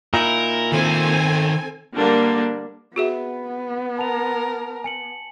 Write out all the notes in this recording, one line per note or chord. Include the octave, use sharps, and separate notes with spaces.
A#2 D#4 E4 A#4
D#3 C4 A4 C5 G#5
D3 G3 A#3 D4
B3 F#4 G#4 E5
A#4 A5 F7
G#5 C#7 F#7